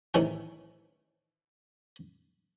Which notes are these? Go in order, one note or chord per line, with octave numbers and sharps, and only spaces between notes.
A2 C3 D#3 E3 C#4 E4